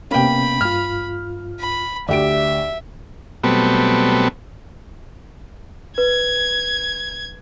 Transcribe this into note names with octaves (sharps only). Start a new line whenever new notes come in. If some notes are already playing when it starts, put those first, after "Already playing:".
C3 A#3 B3 C#4 G5 B5
G2 F4 F6
B5
D2 G4 D5 E5 D7
B2 F#3 G3 A3 B3 C4
B4 G#6